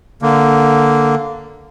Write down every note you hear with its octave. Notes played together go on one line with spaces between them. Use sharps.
D3 A#3